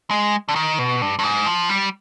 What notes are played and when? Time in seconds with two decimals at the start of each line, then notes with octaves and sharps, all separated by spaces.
0.11 G#3
0.49 D3
0.56 D#3
0.79 B2
1.02 G2
1.19 G2
1.24 G#2
1.46 F3
1.69 G3